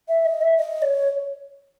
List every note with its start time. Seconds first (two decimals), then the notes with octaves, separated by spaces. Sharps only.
0.08 E5
0.25 D#5
0.41 E5
0.58 D#5
0.82 C#5